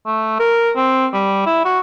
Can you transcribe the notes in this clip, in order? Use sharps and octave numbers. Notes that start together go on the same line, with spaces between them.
A3
A#4
C4
G3
E4
F#4